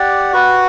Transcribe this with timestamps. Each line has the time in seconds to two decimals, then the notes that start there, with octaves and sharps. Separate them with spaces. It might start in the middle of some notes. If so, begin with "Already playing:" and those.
Already playing: G4 D5 F#5
0.33 F#4 B4 F#5